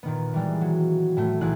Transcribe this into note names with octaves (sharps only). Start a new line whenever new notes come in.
A#2 D#3 B3
E3 G3 G#3
F#3
A2 A3
B1 A#2 E3 E4 G#4 F#6